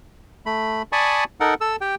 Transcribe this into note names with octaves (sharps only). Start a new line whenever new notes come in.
A3 B5
D5 G#5 A5 B5 C#6 D#6
D#4 A4 A#4 F#5
A4 E6
G4 G5